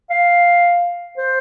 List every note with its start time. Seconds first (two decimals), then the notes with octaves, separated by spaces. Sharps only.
0.10 F5
1.17 C5